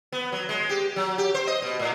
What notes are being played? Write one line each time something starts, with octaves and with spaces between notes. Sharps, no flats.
B3
F#3
G#3
G4
F#3
G4
C5
D#5
B2
A2